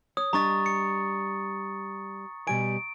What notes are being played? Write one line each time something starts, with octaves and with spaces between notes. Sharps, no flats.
C#5 D#6
G3 D4 D#5 A#5 C#6 A6
C#7
B2 G3 G#5 D7